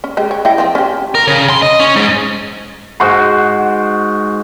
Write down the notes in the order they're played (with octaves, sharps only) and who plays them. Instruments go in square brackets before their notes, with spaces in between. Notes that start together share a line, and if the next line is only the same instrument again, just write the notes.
[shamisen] C#4
G#3 G4
C#5 G5
E4 D#5 G5
F3 C4
C#4 G4
[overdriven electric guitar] A#4
C#3
C6
D#5
C#4
G#2
[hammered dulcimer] G#2 F#4 C6